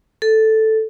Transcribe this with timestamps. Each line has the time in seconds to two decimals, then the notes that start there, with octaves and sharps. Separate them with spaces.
0.22 A4